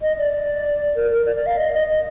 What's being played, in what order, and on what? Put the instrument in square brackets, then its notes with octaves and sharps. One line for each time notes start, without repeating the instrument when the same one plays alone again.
[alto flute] D#5
D5
D5
A#4
A#4
D5
D5
F5
D#5
D#5
D#5